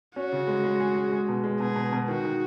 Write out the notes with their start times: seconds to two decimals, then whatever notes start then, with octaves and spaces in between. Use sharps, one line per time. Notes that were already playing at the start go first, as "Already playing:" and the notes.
0.16 C#4 F#4
0.32 C#3
0.47 G#3
0.64 G#3
0.80 G#4
0.97 G#4
1.11 G#3
1.29 B2
1.44 G#3
1.60 B2 G#4
1.76 B2
1.93 B2
2.08 D#3 F#4
2.25 D#3